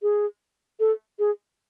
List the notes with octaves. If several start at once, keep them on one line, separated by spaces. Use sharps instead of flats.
G#4
A4
G#4